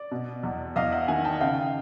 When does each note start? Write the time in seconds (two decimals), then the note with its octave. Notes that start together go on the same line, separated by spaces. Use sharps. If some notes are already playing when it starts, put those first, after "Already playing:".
Already playing: D5
0.11 B2
0.43 E2
0.76 E2 D#5 F5
0.92 E5 F#5
1.08 D#3 F#5 G#5
1.24 G5 A5
1.41 C#3 F5 G5